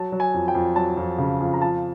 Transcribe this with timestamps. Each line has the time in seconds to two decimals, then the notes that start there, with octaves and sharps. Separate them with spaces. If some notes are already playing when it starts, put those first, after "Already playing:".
Already playing: F#3 A5
0.12 F#3
0.20 G#5
0.34 F2
0.48 G5
0.55 F2
0.76 F#3 A5
0.97 F2
1.18 C#3
1.40 F2
1.54 A#5
1.61 F3 A5